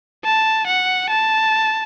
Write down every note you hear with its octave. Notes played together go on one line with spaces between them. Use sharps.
A5
F#5
A5